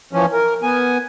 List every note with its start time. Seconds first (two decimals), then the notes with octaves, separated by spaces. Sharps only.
0.13 E3 F3 C#4
0.33 A#4
0.63 B3 G#5